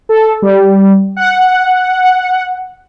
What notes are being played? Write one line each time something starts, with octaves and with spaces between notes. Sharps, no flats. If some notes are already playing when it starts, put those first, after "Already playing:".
A4
G3
F#5